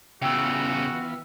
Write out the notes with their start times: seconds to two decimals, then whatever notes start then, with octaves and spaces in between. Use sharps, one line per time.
0.22 E2 C#3 E3 B3 F4 F#4 G5 E6